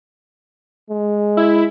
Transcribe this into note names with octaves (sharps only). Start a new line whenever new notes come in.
G#3
E4